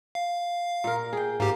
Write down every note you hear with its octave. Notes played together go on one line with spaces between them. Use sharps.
F5
A#2 A#4
G#4 G5
G#2 A#3 G4